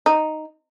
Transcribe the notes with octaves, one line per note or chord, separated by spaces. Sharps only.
D#4